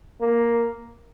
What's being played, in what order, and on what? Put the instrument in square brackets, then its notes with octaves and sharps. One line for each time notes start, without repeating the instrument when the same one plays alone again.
[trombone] A#3